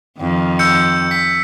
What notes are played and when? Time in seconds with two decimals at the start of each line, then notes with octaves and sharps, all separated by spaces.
0.20 F2 D#3
0.59 E6 G6 C#7
1.11 B6